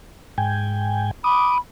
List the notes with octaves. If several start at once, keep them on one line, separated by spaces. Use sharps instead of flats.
G#2 G5 G#5
B5 D6 D#6